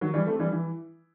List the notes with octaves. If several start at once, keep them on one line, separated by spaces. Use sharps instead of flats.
D#3 F#3
E3 G3
A3 C4
E3 G3
E3